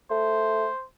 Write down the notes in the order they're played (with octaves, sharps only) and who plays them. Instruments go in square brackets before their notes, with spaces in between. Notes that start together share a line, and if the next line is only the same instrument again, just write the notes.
[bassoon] A3 [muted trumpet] C5